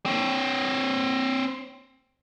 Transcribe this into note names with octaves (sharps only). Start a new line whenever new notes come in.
C4 C#5